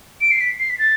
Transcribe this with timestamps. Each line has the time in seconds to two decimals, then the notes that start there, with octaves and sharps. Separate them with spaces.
0.21 D7
0.31 C7
0.41 B6
0.60 C7
0.70 B6
0.79 A6